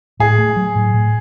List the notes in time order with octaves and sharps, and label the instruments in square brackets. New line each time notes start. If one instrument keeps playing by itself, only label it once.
[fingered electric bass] A2 [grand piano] G#4
[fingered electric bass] A3
F#3
A2
A2